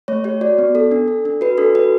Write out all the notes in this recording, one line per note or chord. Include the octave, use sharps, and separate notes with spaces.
A3 C#5
G4 C#5
F#4 D5
B3
A4
D4
A4
D4
F#4 B4
D4 A4
F#4 B4